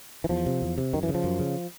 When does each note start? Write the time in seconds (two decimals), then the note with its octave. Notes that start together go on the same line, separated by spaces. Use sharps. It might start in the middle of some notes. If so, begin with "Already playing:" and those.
0.24 E3
0.29 E2 F3
0.46 C3
0.62 E2
0.78 C3
0.93 F#2 D#3
1.03 E3
1.09 C#3
1.14 F3
1.24 F#2
1.39 C#3